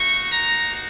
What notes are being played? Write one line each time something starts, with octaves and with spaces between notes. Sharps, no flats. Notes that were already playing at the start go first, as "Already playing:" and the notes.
Already playing: A#3 D#4 F#4 C#6
A#5